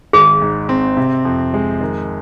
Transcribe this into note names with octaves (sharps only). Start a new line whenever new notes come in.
G#1 G#4
G#2
C4
C3
F2
G#3
D#3